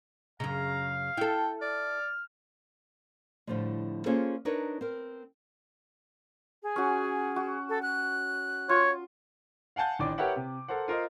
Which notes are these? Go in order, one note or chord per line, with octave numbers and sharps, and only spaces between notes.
F#2 C#3 F5 A#5
E4 A4 G5
D5 F6
A2 D3 F3 G3 G#3
A#3 C#4 F4 G#4 A4 C5
D4 D#4 A#4 B4 C#5
C4 A#4
G#4
C#4 F#4
F#4
A4
F#6
F4 C#5
F5 F#5 G#5 A5 G6
A1 D#3 D4 D5 D6
G4 A#4 B4 C#5 E5 F#5
C3
A4 A#4 C5 F#5
F4 A#4 C5 D#5